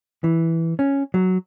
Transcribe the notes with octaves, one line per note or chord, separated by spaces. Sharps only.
E3
C#4
F#3